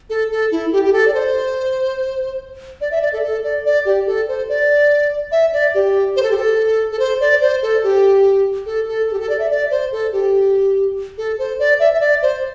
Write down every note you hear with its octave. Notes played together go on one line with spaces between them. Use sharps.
A4
A4
E4
G4
G4
A4
D5
C5
D5
E5
D5
A4
A4
D5
D5
G4
A4
C5
D5
E5
D5
G4
C5
A4
G4
A4
A4
C5
D5
C5
A4
G4
A4
A4
A4
G4
A4
D5
E5
D5
C5
A4
G4
A4
C5
D5
E5
E5
D5
C5